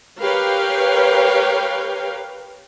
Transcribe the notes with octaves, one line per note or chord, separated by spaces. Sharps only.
G4 A#4 B4 C#5 F5 G5